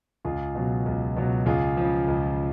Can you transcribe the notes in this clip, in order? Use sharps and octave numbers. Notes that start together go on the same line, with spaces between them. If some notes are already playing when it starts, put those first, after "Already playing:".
C#2 F4 G#4
B2 F#3
C#2
B2 F#3
C#2 F4 G#4
C#3 F3
C#2